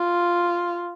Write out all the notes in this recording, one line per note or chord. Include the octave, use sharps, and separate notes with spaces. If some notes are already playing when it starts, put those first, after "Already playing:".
Already playing: F4